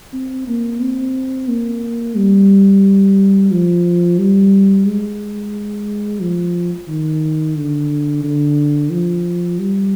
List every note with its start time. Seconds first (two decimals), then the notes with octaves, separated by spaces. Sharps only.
0.13 C4
0.48 A#3
0.82 C4
1.49 A#3
2.16 G3
3.51 F3
4.19 G3
4.87 G#3
6.22 F3
6.88 D#3
7.57 D3
8.23 D3
8.91 F3
9.59 G3